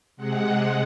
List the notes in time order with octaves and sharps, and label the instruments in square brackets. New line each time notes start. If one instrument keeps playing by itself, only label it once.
[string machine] C3 G#3 F#5